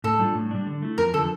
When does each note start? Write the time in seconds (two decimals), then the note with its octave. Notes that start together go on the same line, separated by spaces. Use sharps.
0.04 A2 A4
0.19 G3 D4 F4
0.35 A2
0.51 G3 D4
0.67 D3
0.82 A3 E4
0.98 F2 A#4
1.14 D3 F3 A4